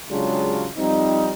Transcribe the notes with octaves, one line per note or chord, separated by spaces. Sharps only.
C#3 F#3 G#3 D4 F4 G4
F3 G3 C4 D#4